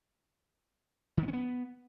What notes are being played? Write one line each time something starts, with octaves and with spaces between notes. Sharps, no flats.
D#3
B3
C#4
B3